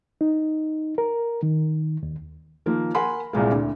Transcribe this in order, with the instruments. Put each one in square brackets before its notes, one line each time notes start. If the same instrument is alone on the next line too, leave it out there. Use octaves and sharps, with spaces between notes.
[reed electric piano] D#4
A#4
D#3
D#2
[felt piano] D#3 F3 A#3
A#4 F#5 G#5 B5 C6
C2 A#2 G#3 A#3
D2